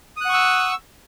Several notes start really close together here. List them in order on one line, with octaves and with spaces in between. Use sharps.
D#6 F#6 F#5 C#6 E6